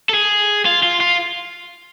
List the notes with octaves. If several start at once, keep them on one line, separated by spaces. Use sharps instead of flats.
A4
G#4
F4
F4
F4